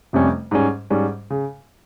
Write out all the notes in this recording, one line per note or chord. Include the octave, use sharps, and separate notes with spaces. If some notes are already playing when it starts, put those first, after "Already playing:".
F1 F2 C3 G3 C#4
G#2 G3 C#4
G#2 G3 C#4
C#3